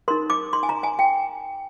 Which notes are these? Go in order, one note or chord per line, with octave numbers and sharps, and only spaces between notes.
D#4 A#4 C6
D6
C6
G#5
A#5
G#5
G5